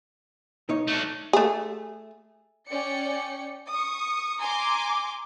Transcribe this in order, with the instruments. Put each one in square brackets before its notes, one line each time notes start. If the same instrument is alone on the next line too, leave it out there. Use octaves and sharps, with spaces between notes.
[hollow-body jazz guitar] B1 D#4 C#5
[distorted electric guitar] A3 D4
[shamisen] A3 G#4
[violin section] C#4 D5 G5 C#7
C#6 D#6
G#5 A#5 C6 D6